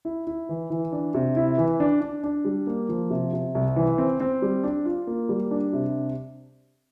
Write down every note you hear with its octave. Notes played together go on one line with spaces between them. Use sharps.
E4
E4
E3
E3
D4
C3
E4
E3
D4
D4
D4
G3
A#3
F3
C3
C3
C2
E3
C4
C4
G3
D4
F4
A#3
G3
D4
C3